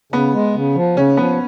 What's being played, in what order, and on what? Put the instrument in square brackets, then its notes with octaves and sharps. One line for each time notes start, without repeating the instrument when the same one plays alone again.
[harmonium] C#3 [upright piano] B3
[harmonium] G#3
C#3
F3
[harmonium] C#3 [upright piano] C#4
[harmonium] F3 [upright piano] B3